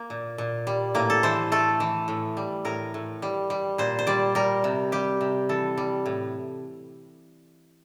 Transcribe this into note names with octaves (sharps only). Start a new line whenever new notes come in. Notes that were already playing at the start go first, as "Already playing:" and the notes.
Already playing: A#3
A#2
A#2
G3
A2 A#3
A4
E3 C5
A3 A4
E3
A2
G3
A2 A#4
A2
G3
G3
A#2 C5
C5
G3 D5
G3 A#4
C3
G3 G4
C3
E3 A4
G3
A2